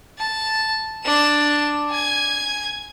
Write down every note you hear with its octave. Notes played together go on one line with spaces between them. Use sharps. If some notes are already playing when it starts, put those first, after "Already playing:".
A5
D4 E7
G#5 G#6